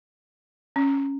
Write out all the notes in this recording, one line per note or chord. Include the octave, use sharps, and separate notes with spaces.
C#4